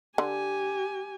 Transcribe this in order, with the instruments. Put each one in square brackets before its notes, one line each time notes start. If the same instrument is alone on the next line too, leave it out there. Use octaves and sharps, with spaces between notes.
[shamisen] D3 [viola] G4 G#5